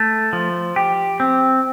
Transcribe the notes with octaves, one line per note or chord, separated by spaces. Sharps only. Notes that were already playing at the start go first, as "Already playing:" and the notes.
Already playing: A3
F3
G4
C4